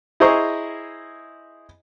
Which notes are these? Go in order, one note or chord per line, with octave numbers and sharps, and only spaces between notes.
E4 G#4 C5 D#5 A#5 C#6